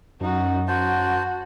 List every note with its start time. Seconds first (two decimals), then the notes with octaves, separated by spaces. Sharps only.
0.21 F#2 D#4 F#4
0.68 F#4 C5 A5